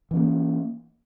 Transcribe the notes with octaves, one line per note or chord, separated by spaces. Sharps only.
E3 A#3 C#4